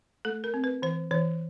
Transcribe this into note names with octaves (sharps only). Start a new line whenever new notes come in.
A3 A4
A#4
C4
B4
E3 C5
E3 C#5